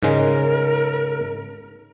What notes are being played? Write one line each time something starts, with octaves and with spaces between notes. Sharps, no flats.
G#2 C#3 G#3 A#4